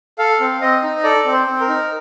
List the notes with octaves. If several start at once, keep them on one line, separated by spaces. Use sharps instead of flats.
A4 F5
C4
C4 D#5
D#4
A4 D5
C4
C5
C4
A#4
D#4